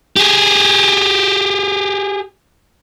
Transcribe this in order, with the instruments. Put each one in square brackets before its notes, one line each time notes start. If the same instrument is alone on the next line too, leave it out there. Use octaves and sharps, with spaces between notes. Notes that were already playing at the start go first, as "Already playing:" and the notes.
[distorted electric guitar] G4 G#4